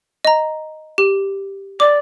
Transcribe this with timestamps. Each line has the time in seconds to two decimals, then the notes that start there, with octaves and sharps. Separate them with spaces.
0.25 D#5 A#5
0.98 G4
1.80 D5 D6